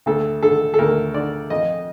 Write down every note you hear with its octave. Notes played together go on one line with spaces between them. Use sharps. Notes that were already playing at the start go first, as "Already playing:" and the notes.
D2 A4
D3 A4
A4
D2 A#4
D3 D5
F2 D#5